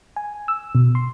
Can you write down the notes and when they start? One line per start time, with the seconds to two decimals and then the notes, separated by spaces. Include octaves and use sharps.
0.16 G#5
0.48 E6
0.75 B2
0.95 C6